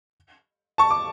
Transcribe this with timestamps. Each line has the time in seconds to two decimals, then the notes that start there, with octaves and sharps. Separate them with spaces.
0.78 A5 C#6
0.91 D6